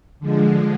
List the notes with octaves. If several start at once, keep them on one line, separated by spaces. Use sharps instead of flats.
D3 F3 G#3